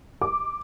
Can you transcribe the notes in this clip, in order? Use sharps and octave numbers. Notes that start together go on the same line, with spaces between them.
D6